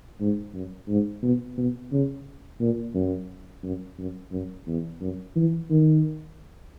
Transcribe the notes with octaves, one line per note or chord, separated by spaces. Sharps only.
G#2
F#2
G#2
B2
B2
C#3
A#2
F#2
F#2
F#2
F#2
E2
F#2
E3
D#3